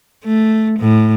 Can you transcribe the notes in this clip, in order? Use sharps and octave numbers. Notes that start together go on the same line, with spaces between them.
A3
A2